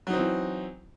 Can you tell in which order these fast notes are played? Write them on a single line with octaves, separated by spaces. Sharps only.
F#3 D#4 C4 E3